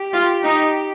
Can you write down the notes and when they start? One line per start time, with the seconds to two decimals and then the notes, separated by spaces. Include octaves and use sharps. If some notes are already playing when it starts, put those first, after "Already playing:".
Already playing: G4
0.13 F4
0.43 D#4